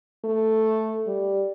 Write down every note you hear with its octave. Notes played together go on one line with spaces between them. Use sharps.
A3
G3